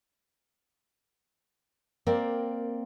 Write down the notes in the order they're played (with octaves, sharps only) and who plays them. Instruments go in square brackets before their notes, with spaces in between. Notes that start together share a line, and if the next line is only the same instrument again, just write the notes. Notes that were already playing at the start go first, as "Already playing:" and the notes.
[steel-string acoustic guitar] A#3 C4 A#4 D5 G5